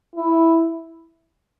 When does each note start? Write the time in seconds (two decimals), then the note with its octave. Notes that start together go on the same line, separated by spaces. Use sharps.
0.15 E4